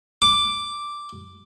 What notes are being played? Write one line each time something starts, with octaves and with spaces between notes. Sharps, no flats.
D6